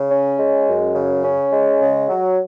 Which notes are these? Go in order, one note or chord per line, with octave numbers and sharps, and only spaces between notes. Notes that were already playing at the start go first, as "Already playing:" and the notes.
Already playing: C#3
C#4
G#3
F#2
C#3
C#4
G#3
C#3
F#3